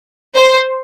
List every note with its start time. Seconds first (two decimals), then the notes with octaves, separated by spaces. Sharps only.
0.34 C5